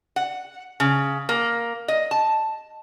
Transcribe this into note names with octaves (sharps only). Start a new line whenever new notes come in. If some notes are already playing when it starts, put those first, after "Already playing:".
F#5
C#3
A#3
D#5
A5